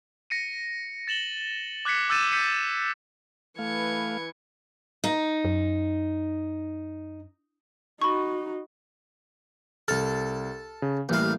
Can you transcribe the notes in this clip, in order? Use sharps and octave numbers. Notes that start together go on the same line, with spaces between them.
A#6 C#7 D#7
A6 E7 F#7 G7
D6 F#6 G#6 B6 C#7
D6 E6 G6 A6 D#7 E7
E6 G6 B6 C#7 D#7
E3 A3 B4 F5 G#6 C#7
D#4
F#2
D#4 F#4 B5 C#6
C2 A4 F6
C#3
A1 G3 A#3 F5